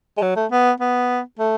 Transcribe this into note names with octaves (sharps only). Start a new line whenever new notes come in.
G#3
F#3
A3
B3
B3
A3